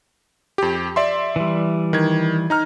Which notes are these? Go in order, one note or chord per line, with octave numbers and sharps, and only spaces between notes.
F2 G4
D5 E5 C6
E3 G3
D#3 G#6
D#4 A#5 F6